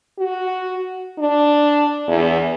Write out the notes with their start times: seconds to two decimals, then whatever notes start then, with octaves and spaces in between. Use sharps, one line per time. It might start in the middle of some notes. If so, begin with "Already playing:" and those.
0.19 F#4
1.18 D4
2.08 E2